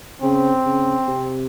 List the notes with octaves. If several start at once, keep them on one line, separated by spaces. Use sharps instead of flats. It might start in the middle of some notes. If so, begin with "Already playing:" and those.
C#3 C4
C#3
C3